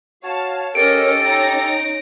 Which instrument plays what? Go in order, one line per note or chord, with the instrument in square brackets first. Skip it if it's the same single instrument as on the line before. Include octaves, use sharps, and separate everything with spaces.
[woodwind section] F#4 C#5 [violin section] F5 A5
[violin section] C#4 C#5 D#5 [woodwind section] G4 A4 [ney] A#4 [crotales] D7
[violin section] C#4 D#4 A#6 [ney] G5